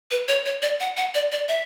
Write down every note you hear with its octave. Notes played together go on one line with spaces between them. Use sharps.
B4
C#5
C#5
D5
F#5
F#5
D5
D5
E5